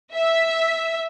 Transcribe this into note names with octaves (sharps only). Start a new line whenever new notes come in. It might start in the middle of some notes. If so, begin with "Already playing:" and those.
E5